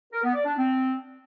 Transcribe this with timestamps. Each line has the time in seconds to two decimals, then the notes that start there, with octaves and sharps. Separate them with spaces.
0.12 A#4
0.23 B3
0.34 D5
0.45 D4
0.56 C4